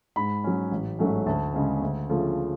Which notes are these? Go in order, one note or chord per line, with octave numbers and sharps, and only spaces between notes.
G#2 B5
F#3 C#4
A1
G#2 F#3 A3 C#4
D2 A5
C#3 G#3 C#4
D2
C#3 F3 A3